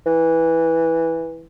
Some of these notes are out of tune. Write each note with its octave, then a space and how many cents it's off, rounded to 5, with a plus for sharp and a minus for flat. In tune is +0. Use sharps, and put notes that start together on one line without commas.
E3 -5